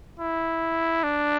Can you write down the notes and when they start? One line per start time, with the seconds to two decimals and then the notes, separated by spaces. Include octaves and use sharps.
0.19 E4
1.04 D4